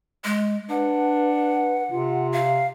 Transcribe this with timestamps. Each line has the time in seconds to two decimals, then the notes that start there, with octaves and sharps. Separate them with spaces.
0.24 G#3
0.70 D4 B4 F#5
1.91 C3 F4
2.32 F5